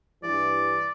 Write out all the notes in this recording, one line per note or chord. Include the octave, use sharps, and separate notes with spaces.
G2 E3 D5